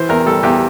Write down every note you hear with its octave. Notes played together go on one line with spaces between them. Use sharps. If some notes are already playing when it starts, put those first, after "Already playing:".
Already playing: E3 C5
E2 A#4
G3 A4
E2 G4